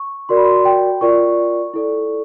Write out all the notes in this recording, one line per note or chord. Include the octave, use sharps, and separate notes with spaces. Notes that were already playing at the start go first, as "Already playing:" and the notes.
Already playing: C#6
F#4 A#4 D5 C6
B5
C6
G5
F4 A#4 D5 C#6
E4 A4 D5